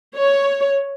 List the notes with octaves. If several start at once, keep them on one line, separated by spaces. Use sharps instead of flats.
C#5